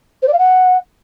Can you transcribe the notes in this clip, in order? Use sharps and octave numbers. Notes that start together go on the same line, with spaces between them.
C5
D5
F5
F#5